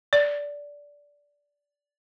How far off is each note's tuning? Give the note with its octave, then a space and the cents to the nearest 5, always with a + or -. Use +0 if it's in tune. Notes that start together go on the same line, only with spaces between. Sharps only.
D5 -15